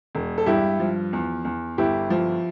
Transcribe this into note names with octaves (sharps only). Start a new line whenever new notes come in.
E1
A4
G2 E4 G4
F3
E2
E2
G1 E4 G4
F3